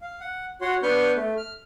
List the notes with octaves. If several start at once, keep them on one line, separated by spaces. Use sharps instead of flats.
F5
F#5
F#4 C#5 F#5 C6
B3 D4 B4 C#6 F6 G6
A3
F6